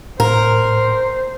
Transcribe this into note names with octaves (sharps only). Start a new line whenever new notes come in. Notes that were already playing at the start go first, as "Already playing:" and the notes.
A2 A#4 C5